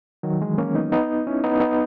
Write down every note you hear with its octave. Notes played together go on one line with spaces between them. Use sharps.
D#3 F#3
E3 G#3
A#3 C#4
B3 D#4
B3 D#4
C#4 E4
B3 D#4
B3 D#4